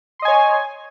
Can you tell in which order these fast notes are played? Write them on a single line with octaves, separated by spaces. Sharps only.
C6 D#5 G#5 C#5